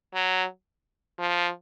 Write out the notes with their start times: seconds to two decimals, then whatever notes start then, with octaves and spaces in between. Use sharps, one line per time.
0.14 F#3
1.19 F3